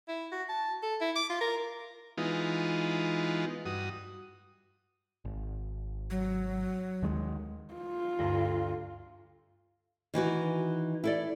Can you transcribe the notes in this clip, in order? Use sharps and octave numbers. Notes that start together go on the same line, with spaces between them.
E4
F#4
A5
A4
E4
D6
F4
A#4
E3 G#3 B3 D#4 F4
G2 F#4 D#6
G#1
F#3
D#2 D#3 G#3
F4
D2 G2 A#6
D#3 E3 D#4 F#4
E4 A4 D5